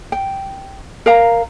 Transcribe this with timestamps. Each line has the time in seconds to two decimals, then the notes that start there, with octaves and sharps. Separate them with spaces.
0.12 G5
1.06 A#4 F5 A#5